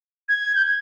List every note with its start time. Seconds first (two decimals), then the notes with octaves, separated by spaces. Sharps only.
0.29 G#6
0.55 G6
0.65 G#6